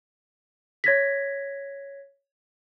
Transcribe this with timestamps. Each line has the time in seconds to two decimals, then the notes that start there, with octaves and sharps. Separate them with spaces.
0.84 C#5 G#6 A#6 B6